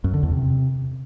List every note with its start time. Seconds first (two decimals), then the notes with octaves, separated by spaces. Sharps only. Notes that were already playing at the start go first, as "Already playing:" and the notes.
0.04 F#2
0.14 D3
0.23 E2
0.32 C3